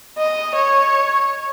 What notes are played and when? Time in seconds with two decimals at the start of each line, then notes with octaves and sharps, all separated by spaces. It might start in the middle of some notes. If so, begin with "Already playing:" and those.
0.18 D#5
0.54 C#5